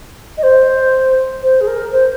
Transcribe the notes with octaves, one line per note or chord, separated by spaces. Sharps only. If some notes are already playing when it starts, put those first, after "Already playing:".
D#5
C5
C5
G#4
A#4
C5